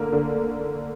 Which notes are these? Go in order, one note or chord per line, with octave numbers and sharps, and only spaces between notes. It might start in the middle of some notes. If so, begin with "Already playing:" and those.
Already playing: D3 A#3
D3